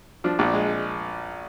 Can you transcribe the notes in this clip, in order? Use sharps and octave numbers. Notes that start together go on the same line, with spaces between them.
F3 D4
A#1 D4
G#3